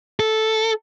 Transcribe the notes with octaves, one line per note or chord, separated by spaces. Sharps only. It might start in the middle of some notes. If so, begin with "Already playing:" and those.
A4